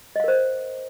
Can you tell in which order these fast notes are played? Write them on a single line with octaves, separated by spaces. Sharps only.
D#5 F5 A#4 C5